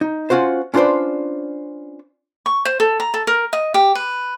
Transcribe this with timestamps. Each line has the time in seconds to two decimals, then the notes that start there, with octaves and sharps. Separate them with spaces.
0.01 D#4
0.30 C#4 F4 F#4 C5
0.74 C#4 D4 F4 B4 C5 D5
2.46 C#6
2.65 C5
2.80 A4
3.00 A#5
3.14 A4
3.27 A#4
3.53 D#5
3.74 G4
3.95 B4